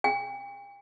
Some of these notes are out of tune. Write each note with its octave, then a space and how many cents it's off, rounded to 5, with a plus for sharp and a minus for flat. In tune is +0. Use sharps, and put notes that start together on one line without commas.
G5 +40